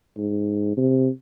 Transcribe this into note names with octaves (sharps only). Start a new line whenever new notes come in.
G#2
C3